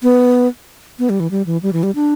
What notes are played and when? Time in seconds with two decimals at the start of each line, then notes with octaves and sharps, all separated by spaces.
0.03 B3
0.99 B3
1.10 G3
1.20 E3
1.31 G3
1.46 E3
1.63 G3
1.73 E3
1.83 G3
1.95 D4